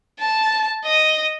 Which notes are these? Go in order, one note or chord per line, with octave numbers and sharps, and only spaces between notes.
A5
D#5